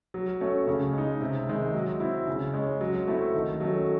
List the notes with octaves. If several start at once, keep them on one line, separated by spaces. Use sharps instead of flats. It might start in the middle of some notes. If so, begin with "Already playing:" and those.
F#3
A3 C#4
C#3
G#3 D#4
C3
D#3 G#3
F#3
C4 E4
C#3
G#3 C#4
F#3
A3 C4 E4
D#3
F#3 A3 C#4